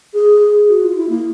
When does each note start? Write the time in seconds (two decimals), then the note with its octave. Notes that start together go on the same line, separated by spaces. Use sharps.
0.14 G#4
0.68 F#4
0.82 F4
0.96 E4
1.09 A#3